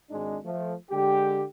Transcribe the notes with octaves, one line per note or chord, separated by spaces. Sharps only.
G#1 G#2 G#3 D4 D#4
F3 A3
D3 G#3 G4